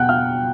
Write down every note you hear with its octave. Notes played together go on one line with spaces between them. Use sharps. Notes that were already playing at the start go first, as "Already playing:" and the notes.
Already playing: B2 F#5 G5 F#6
F5 F6